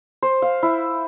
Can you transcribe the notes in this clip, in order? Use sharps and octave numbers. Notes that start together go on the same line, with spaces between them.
C5
F5
E4